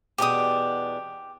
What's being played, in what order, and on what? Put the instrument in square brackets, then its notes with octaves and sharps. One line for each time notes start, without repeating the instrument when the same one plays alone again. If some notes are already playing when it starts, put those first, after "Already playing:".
[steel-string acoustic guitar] E2 B2 D4 [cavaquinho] G4 D#6